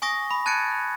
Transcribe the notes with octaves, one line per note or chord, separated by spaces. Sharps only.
G#5 C#6 D#6 A#6
B5
A5 F#6 G#6 A6 C#7 D7